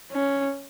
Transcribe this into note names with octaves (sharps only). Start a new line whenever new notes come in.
C#4